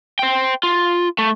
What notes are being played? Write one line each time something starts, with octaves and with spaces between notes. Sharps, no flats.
C5 G5
F4
A3